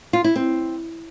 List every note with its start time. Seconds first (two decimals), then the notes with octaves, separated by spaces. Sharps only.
0.13 F4
0.24 E4
0.36 C4